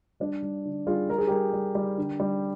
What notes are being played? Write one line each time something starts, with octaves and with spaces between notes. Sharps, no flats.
G3 D4
G3
D3
G3 F4 G#4
G3 A#4
G#4
G3 G4 A#4
G3
G3
D3
G3